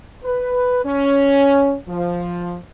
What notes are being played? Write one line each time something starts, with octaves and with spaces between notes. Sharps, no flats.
B4
C#4
F3